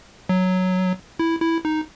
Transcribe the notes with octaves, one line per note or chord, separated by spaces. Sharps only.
F#3
E4
E4
D#4